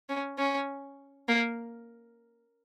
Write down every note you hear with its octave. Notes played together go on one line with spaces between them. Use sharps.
C#4
C#4
A#3